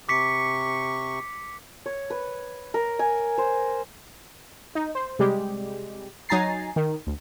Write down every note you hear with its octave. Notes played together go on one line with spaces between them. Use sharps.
C3 C#6 D6 B6 C#7
C#5
B4
A#4
G#5
C5
D#4
C5
C3 G3 G#3 G4
F#3 D#4 G#5 A#5 A6 C7
D#3
D2